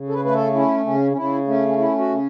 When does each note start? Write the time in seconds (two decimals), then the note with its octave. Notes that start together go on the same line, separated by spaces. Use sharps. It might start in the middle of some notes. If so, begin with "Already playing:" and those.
Already playing: C#3
0.09 A4
0.14 B4
0.25 A3 B4
0.34 A4
0.54 C#4 E4
0.86 C#3 C#4
1.12 C#4
1.17 C#3 E4
1.47 A3 C#4
1.68 C#4
1.78 C#4 E4
1.99 F#4
2.09 C#3